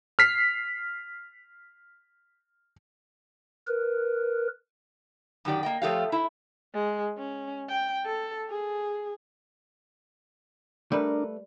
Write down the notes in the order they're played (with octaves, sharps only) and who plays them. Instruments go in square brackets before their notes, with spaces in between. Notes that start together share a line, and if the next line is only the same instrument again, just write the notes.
[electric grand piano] F6 B6 C7
[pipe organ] A#4 B4
[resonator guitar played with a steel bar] F#2 D#3 G4 D5
A#3 D#5 G5
F3 A3 F4 G4 C#5 F5
E4 E5
[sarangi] G#3
C#4
G5
A4
G#4
[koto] G3 [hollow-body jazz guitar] A3 B4 [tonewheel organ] D4 [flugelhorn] A#4